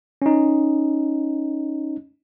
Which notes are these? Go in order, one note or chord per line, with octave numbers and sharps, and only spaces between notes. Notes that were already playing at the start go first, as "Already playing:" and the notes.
C#4 D#4